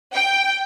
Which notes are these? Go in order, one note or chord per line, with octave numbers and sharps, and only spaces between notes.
G5